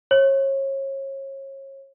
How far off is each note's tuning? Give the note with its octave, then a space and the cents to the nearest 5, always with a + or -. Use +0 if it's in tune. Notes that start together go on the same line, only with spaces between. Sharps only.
C#5 -35